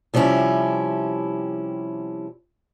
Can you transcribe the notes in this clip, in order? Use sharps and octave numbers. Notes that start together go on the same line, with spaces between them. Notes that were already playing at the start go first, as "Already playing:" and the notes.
C3 F3 G3 C#4 E4